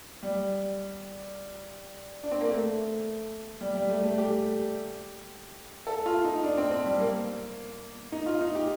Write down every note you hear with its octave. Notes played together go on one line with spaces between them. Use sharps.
G3
D4
C4
A#3
A3
G3
G3
A3
A3
G4
A4
F4
D#4
D4
C4
C4
G3
A#3
D#4
F4
D#4
G4